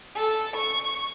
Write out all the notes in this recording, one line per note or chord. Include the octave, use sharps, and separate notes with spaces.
A4
C#6